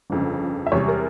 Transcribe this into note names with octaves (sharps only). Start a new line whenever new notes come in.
G1 F2 C#3
E5
E2 C3 G3 C#5
A#4